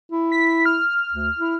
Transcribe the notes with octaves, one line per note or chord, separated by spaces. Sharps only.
E4
B6
F6
D2
E4